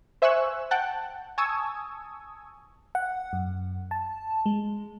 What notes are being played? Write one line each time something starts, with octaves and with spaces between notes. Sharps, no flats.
C5 E5 G#5 C#6 E6 F#6
F#5 G5 A5 F#6
G#5 A5 C#6 D#6 E6 G#6
F#5
F#2
A5
G#3